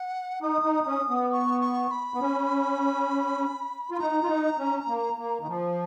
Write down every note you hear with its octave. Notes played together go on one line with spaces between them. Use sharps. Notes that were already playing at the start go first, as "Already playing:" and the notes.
Already playing: F#5
D#4 D#6
D#4
C#4
B3
C#6
C#6
B5
B3
C#4
F4 B5
D#4 A#5
F4
D#4
C#4
A#3
A#3
D#3
F3